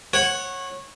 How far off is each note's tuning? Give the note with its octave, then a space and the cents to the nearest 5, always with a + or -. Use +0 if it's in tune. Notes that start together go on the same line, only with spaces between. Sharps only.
C#5 -20 F#5 +0